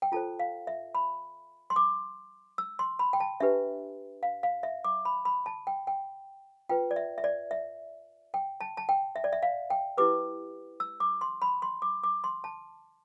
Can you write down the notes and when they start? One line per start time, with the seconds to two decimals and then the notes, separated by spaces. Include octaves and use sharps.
0.02 G5
0.12 F4 A4 C5 A5
0.39 F5
0.67 E5
0.95 B5
1.70 C6
1.76 D6
2.58 E6
2.79 C6
2.99 B5
3.13 G5
3.20 A5
3.40 D4 G4 B4 E5
4.23 F5
4.43 F5
4.63 E5
4.84 D6
5.05 B5
5.25 B5
5.46 A5
5.67 G5
5.87 G5
6.69 F4 B4 G5
6.91 D5
6.96 E5
7.18 E5
7.24 D5
7.51 E5
8.34 G5
8.61 A5
8.77 A5
8.89 G5
9.16 E5
9.24 D5
9.33 E5
9.43 F5
9.70 G5
9.98 E4 G4 B4 D6
10.80 E6
11.00 D6
11.21 C6
11.42 B5
11.62 C6
11.82 D6
12.04 D6
12.24 C6
12.44 A5